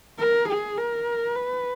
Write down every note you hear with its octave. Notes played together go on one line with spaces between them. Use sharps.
A#4
G#4
A#4
B4